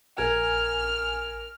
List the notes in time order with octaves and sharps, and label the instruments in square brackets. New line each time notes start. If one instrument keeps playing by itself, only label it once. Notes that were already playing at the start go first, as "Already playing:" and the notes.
[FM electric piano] A#1 G#5 [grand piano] A#4 [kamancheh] F6